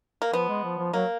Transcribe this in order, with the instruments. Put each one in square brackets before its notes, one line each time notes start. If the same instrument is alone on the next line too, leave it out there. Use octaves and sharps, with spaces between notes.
[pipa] A#3
[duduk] F3 [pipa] B3
[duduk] G#3
F3
F3
[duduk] F#3 [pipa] A#3